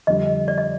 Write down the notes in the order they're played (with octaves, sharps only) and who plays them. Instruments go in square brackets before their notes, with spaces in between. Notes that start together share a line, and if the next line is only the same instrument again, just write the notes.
[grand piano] F2 D3 G3 [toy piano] D#5
[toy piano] D5
D#5